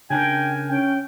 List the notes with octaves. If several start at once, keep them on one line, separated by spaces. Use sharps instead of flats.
C#3 D4 A#4 G5 G#5
C#4 G5